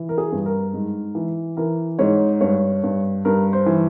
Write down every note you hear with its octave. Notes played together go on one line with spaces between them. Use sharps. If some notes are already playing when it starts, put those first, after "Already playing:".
Already playing: E3
A#4
G#4
G2
A#4
G#2
E3
E3 A#4
G#2 C#5
G2 C#5
G2
G2 A#4
C5
E3